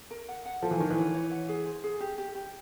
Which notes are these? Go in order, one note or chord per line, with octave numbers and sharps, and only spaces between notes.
A#4
F#5
F#5
F3 A4
E3
D#3 C#5
E3
C#5
C#5
F#5
G#4
C5
G#4
G4
G4
G4